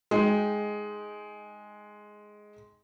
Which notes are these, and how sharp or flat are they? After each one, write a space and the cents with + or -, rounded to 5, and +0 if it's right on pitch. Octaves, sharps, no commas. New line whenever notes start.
G#3 +5 D#4 +0 G5 +0